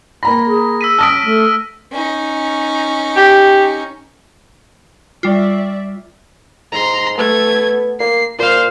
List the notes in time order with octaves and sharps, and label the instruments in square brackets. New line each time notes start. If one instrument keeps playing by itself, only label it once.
[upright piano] A#3 A#5 B5 [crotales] A#6
[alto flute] G#4
[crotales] E6 B6 D#7
[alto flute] C#4 [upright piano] A5 D#6 B6 [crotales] F6 A#6 D7
[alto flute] A3
[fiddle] C#4 D#4
[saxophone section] G4
[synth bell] G3 F4 [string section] D5 E5
[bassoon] G#2 [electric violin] A#5 C6
[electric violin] A3 G#6 [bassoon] B3
[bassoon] A#3 [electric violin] C7
[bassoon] A#2 [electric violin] C5 F5